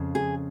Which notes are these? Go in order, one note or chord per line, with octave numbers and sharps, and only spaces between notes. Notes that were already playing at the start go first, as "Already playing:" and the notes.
Already playing: F2 C#3
G#4